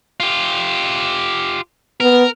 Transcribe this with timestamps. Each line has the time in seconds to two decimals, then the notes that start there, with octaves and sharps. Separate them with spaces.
0.20 F4 G4
2.00 B3 A#4